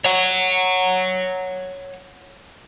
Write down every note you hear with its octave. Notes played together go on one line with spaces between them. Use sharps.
C#5 F#5